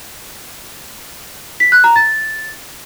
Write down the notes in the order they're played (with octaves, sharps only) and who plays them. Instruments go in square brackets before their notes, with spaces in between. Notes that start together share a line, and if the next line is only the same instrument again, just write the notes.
[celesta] B6
F#6
A#5
A6